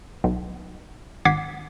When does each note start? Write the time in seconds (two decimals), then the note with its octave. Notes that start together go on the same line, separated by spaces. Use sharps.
0.24 B1
1.25 G#1 F#5 D6 G#6 B6 C7